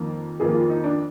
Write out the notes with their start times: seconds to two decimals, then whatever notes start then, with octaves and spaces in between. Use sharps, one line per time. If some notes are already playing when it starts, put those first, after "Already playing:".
Already playing: F2 D#3 A#3 A#4
0.40 F2 D#3 A#3 G#4
0.54 F4
0.69 D#4
0.84 D4